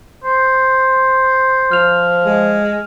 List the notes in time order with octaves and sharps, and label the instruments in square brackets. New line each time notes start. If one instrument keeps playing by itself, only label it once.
[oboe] C5
[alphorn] F3 [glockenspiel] F6 F7
[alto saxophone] G#3